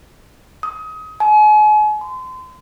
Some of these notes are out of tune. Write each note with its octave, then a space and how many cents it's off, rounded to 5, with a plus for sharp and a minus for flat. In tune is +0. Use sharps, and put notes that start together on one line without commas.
D#6 +30
G#5 +40
C6 -35